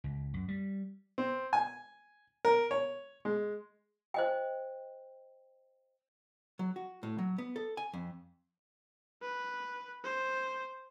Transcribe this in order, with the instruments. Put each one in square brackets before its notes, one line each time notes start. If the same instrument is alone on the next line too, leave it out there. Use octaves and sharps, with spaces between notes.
[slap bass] C#2
F#2
G3
[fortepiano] C4
G#5
A#4
C#5
G#3
[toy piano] C5 D#5 G5
[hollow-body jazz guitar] F#3
F#4
A2
F#3
B3
A4
G#5
F2
[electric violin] B4
C5